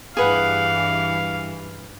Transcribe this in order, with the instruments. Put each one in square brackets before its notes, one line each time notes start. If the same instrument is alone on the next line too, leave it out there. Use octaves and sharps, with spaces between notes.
[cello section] G2 E3 [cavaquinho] G#4 B4 F#5 [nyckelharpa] F5